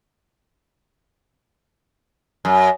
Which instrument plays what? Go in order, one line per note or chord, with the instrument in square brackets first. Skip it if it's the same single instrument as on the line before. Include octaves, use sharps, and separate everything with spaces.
[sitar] F#2